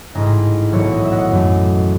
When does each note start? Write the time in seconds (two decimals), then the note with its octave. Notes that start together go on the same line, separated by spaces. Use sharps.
0.15 A1 G#2 E3 D#5
0.72 B1 A2 E3 C#5 E5
0.92 D#5
1.04 E5
1.11 D#5 F#5
1.31 F#2 E3 A3